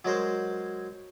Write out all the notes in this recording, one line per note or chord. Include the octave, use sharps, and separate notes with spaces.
F#3 G#3 A#4 C5